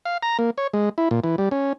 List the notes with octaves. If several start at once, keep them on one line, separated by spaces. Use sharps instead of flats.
F5
A#5
A#3
C#5
G#3
E4
A#2
E3
G3
C#4